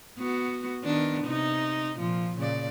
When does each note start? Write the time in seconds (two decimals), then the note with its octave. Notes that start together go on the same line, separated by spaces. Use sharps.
0.18 B3 F#4
0.84 D#3 B3 D4
1.25 C3 D#4
1.98 A#2 F3
2.37 A#2 C#3 D5